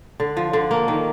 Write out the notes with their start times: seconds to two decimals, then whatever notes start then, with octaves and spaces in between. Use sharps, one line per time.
0.20 D3
0.37 F3
0.53 D3
0.71 A#3
0.88 D#3